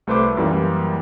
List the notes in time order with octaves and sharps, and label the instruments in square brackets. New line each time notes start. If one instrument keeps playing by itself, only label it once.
[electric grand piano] C2 A3 B4 C5 D6
F#2 E3 G3 A#3